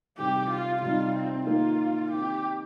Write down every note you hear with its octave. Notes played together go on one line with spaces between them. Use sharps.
C3 G3 C4 D#4 G4
F4
C3 G3 D#4 F4
C4
D#3 A#3 D#4 F4
D#3 C4 D#4 G4